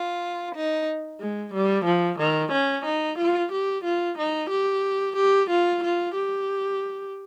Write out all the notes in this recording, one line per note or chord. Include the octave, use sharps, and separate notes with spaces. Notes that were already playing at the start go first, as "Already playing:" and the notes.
Already playing: F4
D#4
G#3
G3
F3
D#3
C#4
D#4
F4
G4
F4
D#4
G4
G4
F4
F4
G4